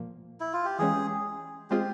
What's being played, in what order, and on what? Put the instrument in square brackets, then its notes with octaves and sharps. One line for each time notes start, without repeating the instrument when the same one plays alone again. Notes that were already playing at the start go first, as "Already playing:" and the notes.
Already playing: [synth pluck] A#2 F3 A#3
[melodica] E4
F4
G4
[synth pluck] E3 G#3 C#4 [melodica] G#4
[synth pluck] G#3 C4 F4 G#4 [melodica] G4